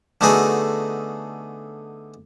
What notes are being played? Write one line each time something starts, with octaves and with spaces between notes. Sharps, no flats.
D3 A3 B3 D#4 F#4 G#4